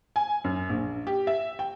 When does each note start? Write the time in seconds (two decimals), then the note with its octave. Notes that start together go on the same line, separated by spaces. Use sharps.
0.16 G#5
0.44 F#2
0.69 A#1
1.07 G4
1.27 E5
1.59 G5